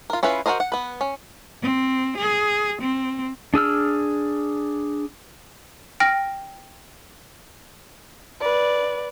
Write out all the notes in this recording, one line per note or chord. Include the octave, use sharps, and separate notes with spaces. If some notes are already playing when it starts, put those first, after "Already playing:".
F4 A#4
C#4 E4 F4 B4
F#4 G#4 A#4 C5 D#5
F#5
B3 B4
C#4
C4
G#4
C4
D4 G#4 E6 F6
G5 F6 A#6
B4 D5